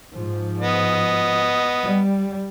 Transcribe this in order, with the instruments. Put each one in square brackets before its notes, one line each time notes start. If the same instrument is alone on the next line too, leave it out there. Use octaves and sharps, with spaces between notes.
[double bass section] G#2 F3
[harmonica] B3 D#5
[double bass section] G3